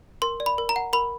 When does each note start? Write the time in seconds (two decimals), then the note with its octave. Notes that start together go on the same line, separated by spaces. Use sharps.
0.22 A#4 C6
0.40 D5
0.46 B5
0.58 A#4
0.69 A#5
0.76 F#5
0.93 A#4 B5